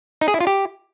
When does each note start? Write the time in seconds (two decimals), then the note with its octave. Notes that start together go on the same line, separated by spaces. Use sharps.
0.21 D#4
0.28 G#4
0.34 E4
0.40 F4
0.47 G4